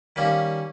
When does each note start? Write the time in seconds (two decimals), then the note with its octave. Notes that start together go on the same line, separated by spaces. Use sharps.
0.16 D#3 G3 A#3 C#4